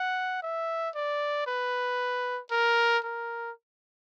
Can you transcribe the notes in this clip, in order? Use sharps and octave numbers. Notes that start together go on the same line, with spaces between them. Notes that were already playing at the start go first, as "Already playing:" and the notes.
Already playing: F#5
E5
D5
B4
A#4
A#4